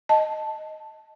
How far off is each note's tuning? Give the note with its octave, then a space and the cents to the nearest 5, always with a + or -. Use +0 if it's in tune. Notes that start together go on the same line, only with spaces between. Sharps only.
D#5 +0 A5 +0